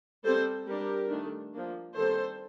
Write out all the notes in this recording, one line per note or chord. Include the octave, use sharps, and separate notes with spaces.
G3 C4 A4 C5
G3 D4 G4 A#4
D#3 A3 D4
F3 A#3 D4
D#3 G3 C4 A4 C5